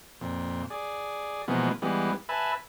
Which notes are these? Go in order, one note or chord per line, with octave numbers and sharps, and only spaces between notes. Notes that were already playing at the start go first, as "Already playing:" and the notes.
F2 A#2
G#4 D5
B2 E3 F3 G#3 A#3 B3
E3 G3 G#3 B3
B4 E5 G#5 A5 B5